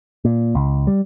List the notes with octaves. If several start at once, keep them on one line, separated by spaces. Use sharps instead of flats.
A#2
C#2
G3